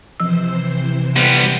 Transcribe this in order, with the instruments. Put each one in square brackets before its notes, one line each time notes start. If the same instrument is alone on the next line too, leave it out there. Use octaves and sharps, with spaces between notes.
[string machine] C3 E3 C5 [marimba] F3 E6
[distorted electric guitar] G3 B3